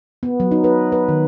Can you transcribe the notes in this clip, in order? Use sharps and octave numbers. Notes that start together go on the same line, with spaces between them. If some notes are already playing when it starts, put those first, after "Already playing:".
B3
F#3
D#4
B4
B4
D#3